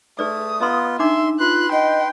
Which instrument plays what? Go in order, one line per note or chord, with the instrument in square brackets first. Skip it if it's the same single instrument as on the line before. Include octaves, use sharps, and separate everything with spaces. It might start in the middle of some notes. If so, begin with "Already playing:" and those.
[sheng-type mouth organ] A3 [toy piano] G#4 B4 D5 [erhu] D#6
[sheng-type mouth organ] B3 F4 [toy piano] D#5 A#5 C6
[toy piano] D4 D#4 D6 [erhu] E5 [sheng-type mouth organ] C6
[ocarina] F4 [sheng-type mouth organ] B4 C6 [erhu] F#6
[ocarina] D#5 [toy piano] F#5 [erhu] G5